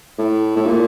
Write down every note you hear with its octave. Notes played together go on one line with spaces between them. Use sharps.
A2
A2
A#2